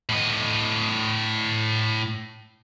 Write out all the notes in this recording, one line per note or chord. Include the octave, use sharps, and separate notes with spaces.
A2 D#5